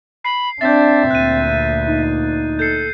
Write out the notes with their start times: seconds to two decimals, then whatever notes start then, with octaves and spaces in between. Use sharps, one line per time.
0.25 B5 C7
0.61 C4 D4 E5 G6 A6
1.10 D2 A#2 F#6 D#7
1.88 D#4
2.59 A4 G6 C7